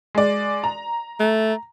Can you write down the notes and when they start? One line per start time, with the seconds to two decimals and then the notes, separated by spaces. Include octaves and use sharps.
0.15 G#3 D5
0.64 A#5
1.20 A3